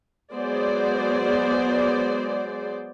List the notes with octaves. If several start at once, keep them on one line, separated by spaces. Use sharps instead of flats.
F#3 G#3 B3 G#4 C5 D5